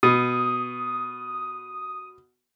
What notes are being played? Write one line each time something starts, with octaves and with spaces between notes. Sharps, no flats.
B2 D#6